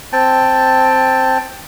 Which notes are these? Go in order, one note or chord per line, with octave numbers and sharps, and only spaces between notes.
C4 G5 A5